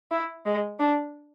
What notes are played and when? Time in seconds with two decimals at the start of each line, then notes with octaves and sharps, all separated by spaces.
0.11 E4
0.46 G#3
0.79 D4